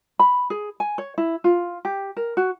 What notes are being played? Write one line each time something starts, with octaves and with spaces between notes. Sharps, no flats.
B5
G#4
G#5
C#5
E4
F4
G4
A#4
F#4